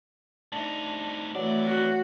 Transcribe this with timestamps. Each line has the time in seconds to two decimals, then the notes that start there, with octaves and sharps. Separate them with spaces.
0.52 A2 D4 D#4
1.35 F2 E3 F#3 A3 D5
1.66 F#4